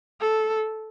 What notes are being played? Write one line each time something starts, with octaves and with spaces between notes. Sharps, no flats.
A4